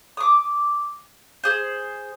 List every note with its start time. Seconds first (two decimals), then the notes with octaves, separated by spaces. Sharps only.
0.17 D6 D#6
1.44 G#4 C5